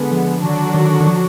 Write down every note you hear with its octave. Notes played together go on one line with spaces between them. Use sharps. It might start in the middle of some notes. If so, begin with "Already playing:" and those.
Already playing: D3 G#3 B3
F3
D3 D#3 F#3 D4 F#4
D#3
D#3
F3